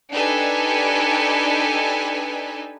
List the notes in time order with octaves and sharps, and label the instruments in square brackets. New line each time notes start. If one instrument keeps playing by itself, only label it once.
[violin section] D4 D#4 G4 A4 B4 G#5